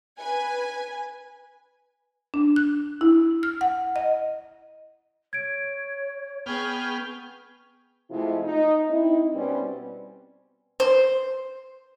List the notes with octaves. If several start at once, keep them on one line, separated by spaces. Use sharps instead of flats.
B4 G#5
D4
F#6
E4
F6
F#5
D#5
C#5 G#6 D7
B3 G#4 G5 C#6 F6
C3 F3 G#3 A3 E4 F4
D#4
C4 D#4 E4
B2 G3 C4 C#4 B4
C5